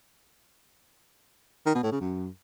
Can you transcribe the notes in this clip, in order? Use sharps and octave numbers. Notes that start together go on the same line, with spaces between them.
D#3
B2
A2
C#3
F#2